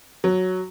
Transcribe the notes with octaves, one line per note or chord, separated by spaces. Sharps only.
F#3